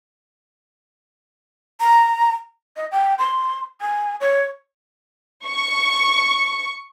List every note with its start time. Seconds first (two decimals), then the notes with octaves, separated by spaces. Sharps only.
1.80 A#5
2.76 D#5
2.92 G5
3.18 C6
3.81 G#5
4.21 C#5
5.45 C#6